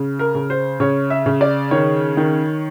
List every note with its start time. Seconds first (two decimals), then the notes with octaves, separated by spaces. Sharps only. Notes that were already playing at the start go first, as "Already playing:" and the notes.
Already playing: C#3
0.19 A#4
0.35 C#3
0.50 C5
0.80 C#3 C#5
1.10 E5
1.26 C#3
1.41 D5
1.71 D#3 C#5
2.17 D#3